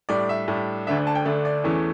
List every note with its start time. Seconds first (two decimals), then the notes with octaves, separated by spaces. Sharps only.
0.09 A2 G3 D4 D5
0.29 E5
0.48 A2 G3 D4
0.87 D2 D3 A3 D4 E5
1.07 A5
1.15 G5
1.25 D2 D3 A3 D4
1.45 D5
1.64 E2 E3 A3 C#4